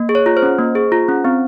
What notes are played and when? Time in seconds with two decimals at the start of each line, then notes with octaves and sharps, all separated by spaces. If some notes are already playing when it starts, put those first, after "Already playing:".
Already playing: A#3
0.09 G#4
0.15 C#5
0.26 F4
0.37 C5
0.43 C#4
0.59 A#3
0.75 G#4
0.92 F4
1.08 C#4
1.25 C4